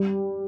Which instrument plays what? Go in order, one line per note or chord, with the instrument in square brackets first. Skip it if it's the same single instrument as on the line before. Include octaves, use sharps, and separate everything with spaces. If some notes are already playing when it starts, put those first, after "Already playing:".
Already playing: [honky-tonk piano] G3